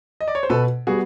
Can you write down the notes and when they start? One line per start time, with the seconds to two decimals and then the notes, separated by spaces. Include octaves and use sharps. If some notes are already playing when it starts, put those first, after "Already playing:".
0.21 D#5
0.28 D5
0.35 C#5
0.43 C5
0.49 B2 A4 B4
0.87 G3 B3 F#4 G#4